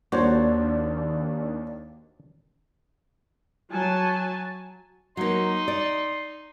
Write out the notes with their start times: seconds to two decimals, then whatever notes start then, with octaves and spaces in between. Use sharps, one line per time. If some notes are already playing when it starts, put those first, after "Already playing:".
0.12 D#2 A#3 D4 F#4 C5 C#5
3.71 F#3 G#5 A5
5.17 F#3 A#3 D#4 C6
5.68 D5